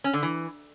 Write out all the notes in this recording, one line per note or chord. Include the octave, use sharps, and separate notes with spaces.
C#4
D3
E3